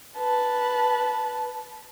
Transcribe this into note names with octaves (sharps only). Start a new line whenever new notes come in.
B4 A5